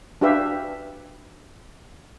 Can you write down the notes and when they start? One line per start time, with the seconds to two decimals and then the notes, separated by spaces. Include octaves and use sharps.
0.21 D4 F#4 G4 B4 E5 F5